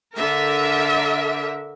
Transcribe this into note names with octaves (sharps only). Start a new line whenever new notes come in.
D3 A#4 E5